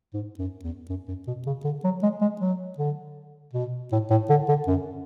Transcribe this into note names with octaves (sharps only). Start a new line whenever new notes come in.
G#2
F#2
E2
F#2
F#2
B2
C#3
D3
F#3
G#3
G#3
F#3
D3
B2
A2
A2
D3
D3
F#2